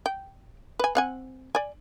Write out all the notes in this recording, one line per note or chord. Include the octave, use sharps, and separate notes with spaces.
G5
B4 G#5
C4 F#5 G#5
D5 G#5